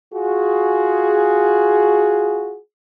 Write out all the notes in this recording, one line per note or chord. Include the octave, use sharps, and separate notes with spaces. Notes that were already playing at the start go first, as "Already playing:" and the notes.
F4 F#4 G#4